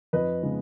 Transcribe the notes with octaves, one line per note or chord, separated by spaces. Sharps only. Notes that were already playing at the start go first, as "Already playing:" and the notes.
F2 B4 D#5
C#3 G#3 B3